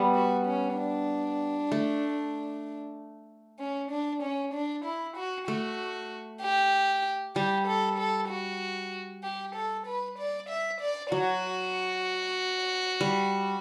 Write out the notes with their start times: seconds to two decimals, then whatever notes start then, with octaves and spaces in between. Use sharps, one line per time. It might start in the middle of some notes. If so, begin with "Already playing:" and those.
Already playing: G3 B3
0.15 F#4
0.46 C#4
0.77 D4
1.72 A3
3.60 C#4
3.91 D4
4.22 C#4
4.54 D4
4.85 E4
5.16 F#4
5.48 A3 F#4
6.42 G4
7.36 G3 G4
7.67 A4
7.98 A4
8.29 F#4
9.23 G4
9.55 A4
9.86 B4
10.18 D5
10.49 E5
10.81 D5
11.12 F#3 F#4
13.01 G3